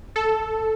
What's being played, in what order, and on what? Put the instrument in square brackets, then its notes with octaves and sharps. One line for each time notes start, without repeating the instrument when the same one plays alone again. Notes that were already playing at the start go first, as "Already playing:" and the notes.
[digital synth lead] A4